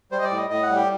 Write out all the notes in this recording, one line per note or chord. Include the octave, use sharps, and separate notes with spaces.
G3 C5
D#5
D5
A2
D#5
A2 D#5
F#5
G3
G4